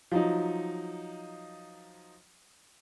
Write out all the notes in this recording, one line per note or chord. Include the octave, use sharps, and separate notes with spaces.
F3 F#3 D#4